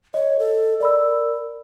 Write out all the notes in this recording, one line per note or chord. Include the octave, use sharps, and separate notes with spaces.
C#5 D#5
A4
A#4 D5 B5 E6